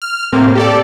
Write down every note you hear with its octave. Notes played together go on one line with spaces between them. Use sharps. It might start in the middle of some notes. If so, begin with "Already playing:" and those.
F6
A2 C3 A#3 C4
G4 A4 D5